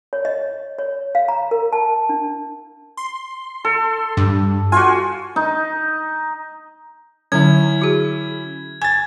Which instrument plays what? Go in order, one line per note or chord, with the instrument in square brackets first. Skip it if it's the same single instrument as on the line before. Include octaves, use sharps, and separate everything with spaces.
[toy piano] C#5
D#5
C#5
F5
A#5
A#4
A5
D4
[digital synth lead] C6
[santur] A4
[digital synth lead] G2
[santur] F4 F#4 [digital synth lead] G#5
[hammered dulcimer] D#4
[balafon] D3 F#3 [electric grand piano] C#4 E4 [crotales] G#6
[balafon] F#4 G#4
[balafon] G#5 [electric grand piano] G#6 A6